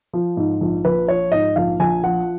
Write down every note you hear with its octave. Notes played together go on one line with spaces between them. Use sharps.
F3
G#2
A#1
A#1 B4
F3 C#5
G#2 D#5
A#1 F5
A#1 G#5
F3 F#5